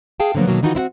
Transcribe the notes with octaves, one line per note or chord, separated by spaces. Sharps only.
G#4 F5 G5 A5
D3 F3 F#3 A#3 B3
B2 D#3 F#3 A#3
D#3 E3 D#4 F4 F#4
C4 E4 F#4 F#5